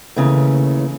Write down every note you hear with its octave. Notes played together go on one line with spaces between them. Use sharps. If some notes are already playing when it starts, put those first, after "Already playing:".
D#2 C#3 E3 A3